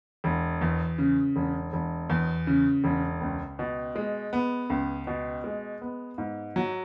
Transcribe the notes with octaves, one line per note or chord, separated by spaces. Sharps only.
E1
E2
C#3
E1
E1
E2
C#3
E1
C#2
B2
G#3
B3
C#2
B2
G#3
B3
G#2
F#3